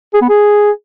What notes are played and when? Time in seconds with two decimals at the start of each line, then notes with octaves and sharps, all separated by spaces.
0.14 G#4
0.21 B3
0.29 G#4